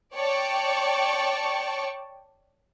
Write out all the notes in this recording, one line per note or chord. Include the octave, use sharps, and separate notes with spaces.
C#5 D5 G5 A5 C#6